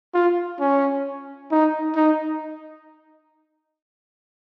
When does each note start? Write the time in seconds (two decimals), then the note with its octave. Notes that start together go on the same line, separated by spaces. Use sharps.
0.14 F4
0.60 C#4
1.51 D#4
1.96 D#4